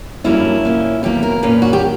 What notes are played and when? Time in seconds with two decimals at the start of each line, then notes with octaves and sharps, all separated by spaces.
0.24 G2 F#3 A#3 C#4 E4
0.64 A#2 A#3 C#4
1.03 B2 F#3 A#3 G4
1.23 A#4
1.43 A#2 A#3 C#4 B4
1.62 F#4
1.73 G4